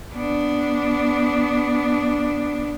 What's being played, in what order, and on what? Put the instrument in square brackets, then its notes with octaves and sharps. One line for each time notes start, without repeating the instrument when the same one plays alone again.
[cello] B3 D4